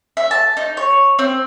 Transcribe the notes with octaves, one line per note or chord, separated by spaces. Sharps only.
E5
A5
D#4
C#5
C4